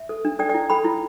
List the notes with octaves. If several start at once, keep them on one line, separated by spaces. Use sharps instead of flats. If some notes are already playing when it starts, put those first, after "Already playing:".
Already playing: E5
A4
D4
A4 D5 G5
D5 G5
E4
A4 G5 B5
E4